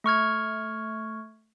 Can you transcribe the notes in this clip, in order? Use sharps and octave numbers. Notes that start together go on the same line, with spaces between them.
A3 C#6 F6 G#6